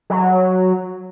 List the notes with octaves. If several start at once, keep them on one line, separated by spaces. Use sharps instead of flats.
F#3